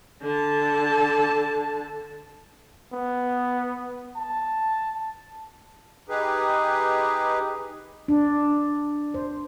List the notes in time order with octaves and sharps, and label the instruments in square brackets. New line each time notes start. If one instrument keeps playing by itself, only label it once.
[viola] D3 A5
[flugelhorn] B3
A5
[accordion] D#4 G4 G#4 B4
[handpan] D4
C5